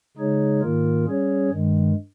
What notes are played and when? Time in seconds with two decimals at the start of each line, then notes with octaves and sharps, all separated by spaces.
0.17 C#3 G#3 D#4 G#4 C#5
0.61 G#2 D#3 A#3 F4 A#4
1.06 G3 C#4 G#4 C#5
1.50 G2 D#3 G#3